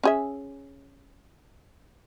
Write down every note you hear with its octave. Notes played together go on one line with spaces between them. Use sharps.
C#4 G#4 E5